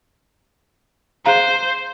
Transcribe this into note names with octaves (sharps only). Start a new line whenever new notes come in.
G#4 C5 F5 A#5